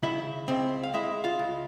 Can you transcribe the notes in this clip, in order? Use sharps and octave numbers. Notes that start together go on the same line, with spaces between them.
C#3 E4 E5
C#2 C4 C5
F5
G#3 E4 E5
F4 F5
C#2